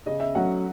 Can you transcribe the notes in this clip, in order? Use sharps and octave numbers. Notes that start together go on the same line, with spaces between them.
C#3 D#5
E5
F#3 A3 C#4 F#4 F#5